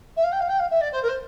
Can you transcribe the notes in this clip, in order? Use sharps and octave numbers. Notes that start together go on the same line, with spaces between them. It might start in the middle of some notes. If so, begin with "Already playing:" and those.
E5
F5
G5
F5
G5
F5
E5
D5
C5
A#4
C5